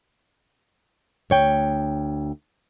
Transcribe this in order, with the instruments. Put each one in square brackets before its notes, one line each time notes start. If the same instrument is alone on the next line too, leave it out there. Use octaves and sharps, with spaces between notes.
[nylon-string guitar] D2 C#5 G5